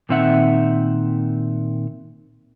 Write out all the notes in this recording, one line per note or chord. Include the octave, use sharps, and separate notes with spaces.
A#2 D#3 C4 D#4 E5 F#5